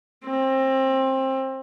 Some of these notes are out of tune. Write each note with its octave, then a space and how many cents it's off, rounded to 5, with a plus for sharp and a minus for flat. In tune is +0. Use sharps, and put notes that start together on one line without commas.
C4 +25